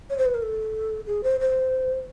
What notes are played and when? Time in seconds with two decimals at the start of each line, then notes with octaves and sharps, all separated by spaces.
0.10 C#5
0.18 C5
0.25 B4
0.34 A#4
0.42 A4
1.07 G#4
1.24 C5
1.40 C5